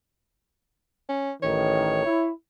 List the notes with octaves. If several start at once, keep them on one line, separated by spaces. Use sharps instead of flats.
C#4
A1 D#3 C#5
E4